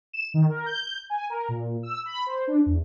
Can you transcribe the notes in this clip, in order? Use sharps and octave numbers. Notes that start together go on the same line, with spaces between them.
E7
D#3
A#4
G6
G#5
A#4
A#2
E6
B5
C5
D4
E2